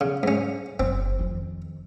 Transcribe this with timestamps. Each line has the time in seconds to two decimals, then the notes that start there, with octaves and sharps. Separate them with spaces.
0.01 C#3
0.23 G#2 C#4
0.80 F#1 F#2 C4
1.19 F2 D#3